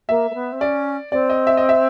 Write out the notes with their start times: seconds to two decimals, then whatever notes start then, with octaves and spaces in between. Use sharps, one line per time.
0.09 A#3 E5
0.30 A#3
0.34 B3
0.52 C4
0.60 C#4 D5
1.12 C4 D5
1.30 D#5
1.47 E5
1.57 D#5
1.69 E5